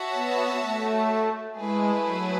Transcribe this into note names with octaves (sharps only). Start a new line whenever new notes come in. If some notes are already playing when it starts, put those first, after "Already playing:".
Already playing: F#4 C#5 E5 A5
B3
A3
G#3 A3 E4 G#4 B4
F#3